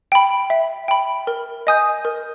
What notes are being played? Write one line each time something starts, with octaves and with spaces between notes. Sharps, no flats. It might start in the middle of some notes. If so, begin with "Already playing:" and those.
G5 B5
E5
G5 B5
A#4
D#5 G#5 D#6 G6
A#4